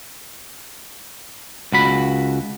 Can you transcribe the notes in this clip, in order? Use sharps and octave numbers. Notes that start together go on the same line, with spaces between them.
C#2 F#4 B5